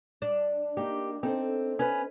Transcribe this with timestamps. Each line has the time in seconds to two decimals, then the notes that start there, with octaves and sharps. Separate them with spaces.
0.22 D4
0.77 A#3 D#4 G4
1.23 C4 D#4 A4 C5
1.79 C#4 B4